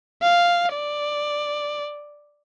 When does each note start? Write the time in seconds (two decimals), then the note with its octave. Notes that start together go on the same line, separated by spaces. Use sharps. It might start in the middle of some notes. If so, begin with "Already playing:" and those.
0.22 F5
0.73 D5